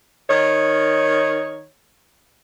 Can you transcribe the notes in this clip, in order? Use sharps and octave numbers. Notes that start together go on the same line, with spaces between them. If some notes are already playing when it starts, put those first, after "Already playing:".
D#3 C#5